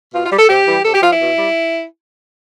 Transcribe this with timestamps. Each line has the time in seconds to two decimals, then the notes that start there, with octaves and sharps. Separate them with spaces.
0.13 B2 F4
0.25 F4
0.31 G3
0.37 A4
0.49 C3 G4
0.66 E3 G3
0.84 C3 A4
0.93 G4
1.02 F3 F4
1.11 E4
1.20 B2
1.37 G3